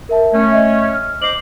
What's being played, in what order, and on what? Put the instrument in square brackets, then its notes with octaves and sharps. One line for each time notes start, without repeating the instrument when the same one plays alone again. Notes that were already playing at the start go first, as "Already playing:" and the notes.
[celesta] A#4 E5 A5
[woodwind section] A3 C#4 [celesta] C#5
[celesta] D#5 E5
F6
[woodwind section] C5 D#5 D6 [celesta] C7 F#7